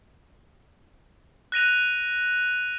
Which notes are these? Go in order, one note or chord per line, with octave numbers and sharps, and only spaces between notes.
F#6 A#6 D#7 F7